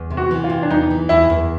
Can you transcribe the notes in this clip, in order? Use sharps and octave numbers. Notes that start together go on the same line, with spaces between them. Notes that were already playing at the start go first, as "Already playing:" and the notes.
Already playing: E2
C3
F#4
E3
F4
C3
D4
E2 D#4
E3
E2 E4
E2